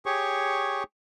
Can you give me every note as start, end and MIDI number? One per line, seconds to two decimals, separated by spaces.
0.06 0.83 67
0.06 0.83 68
0.06 0.83 73
0.06 0.83 85